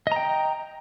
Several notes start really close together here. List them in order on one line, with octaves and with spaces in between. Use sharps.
D#5 A#5 G5